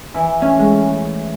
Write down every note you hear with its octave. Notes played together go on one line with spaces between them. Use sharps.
E3 E4
A3 C#4
G#3